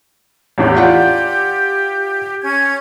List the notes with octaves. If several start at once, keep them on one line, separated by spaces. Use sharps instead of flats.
A1 E2 A2 G4
F4 D5 F#5
C#4 G#6